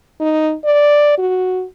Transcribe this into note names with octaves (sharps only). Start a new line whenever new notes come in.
D#4
D5
F#4